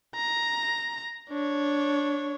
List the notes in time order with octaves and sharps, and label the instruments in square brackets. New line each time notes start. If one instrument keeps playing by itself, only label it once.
[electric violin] A#5
D4 C#5